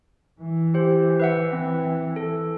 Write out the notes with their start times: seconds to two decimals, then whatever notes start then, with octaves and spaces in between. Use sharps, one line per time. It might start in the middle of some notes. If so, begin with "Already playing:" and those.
0.40 E3
0.74 G4 C5
1.20 B4 E5 F#5
1.53 C4
2.16 A4